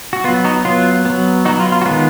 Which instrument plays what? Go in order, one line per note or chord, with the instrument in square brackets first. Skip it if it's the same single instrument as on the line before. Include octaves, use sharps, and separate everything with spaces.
[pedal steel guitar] F#4
B3 F4
F#3
D#4 F#4
F#3 B3 F4
F#3 B3
F#3 B3 D#4 F#4
F4
F4
F#4
D#3 G#3 B3 F4